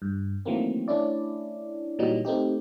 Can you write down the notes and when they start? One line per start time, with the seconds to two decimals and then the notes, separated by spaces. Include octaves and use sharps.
0.02 G2
0.45 D#3 E3 F#3 A3 A#3 C4
0.88 A3 C#4 D4 E4 D5
1.99 A#2 E3 F#3 G3 D#4
2.25 A3 C4 D#4 G4